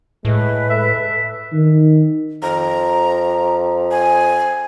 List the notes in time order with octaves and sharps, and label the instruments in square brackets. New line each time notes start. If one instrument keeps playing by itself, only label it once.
[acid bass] A2 [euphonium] G#3 [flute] B4
[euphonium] A4 [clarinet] E5
[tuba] D#3
[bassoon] F2 [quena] A#5
[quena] G#5